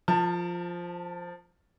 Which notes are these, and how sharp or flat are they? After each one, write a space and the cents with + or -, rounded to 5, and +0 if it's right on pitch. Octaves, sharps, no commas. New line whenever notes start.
F3 +0 A#4 -15 A5 +25